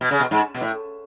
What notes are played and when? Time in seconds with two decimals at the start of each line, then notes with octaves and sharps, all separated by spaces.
0.01 B2
0.11 C#3
0.20 B2
0.31 G#2
0.54 B2
0.61 A2